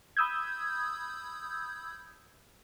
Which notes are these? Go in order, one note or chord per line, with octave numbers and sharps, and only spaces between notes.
B5 D#6 E6 G6 G#6